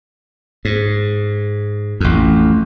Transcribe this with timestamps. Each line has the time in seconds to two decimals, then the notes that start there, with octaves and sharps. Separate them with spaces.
0.65 G#2
2.00 A1 F2